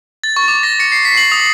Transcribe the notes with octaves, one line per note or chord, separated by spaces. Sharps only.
A6
C#6
D6
A#6
C#7
C7
B6
F#7
D#6